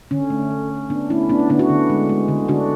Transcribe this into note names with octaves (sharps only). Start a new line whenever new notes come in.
D3 C#4
A3
A3
D3
D3 B3 D4
A3 C#4 E4
A3 B3 D4
C#4
D3 B3 D4
D4 F#4
D3
G#3
G#3
D3
D3 D4 F#4